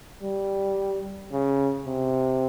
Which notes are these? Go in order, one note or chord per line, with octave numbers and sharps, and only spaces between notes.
G3
C#3
C3